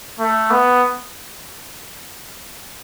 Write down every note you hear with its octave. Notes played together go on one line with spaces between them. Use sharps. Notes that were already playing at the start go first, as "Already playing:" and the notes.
A3
B3